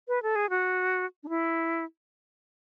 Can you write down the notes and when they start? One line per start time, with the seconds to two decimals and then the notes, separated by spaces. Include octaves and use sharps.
0.08 B4
0.23 A4
0.36 G#4
0.50 F#4
1.23 D4
1.29 E4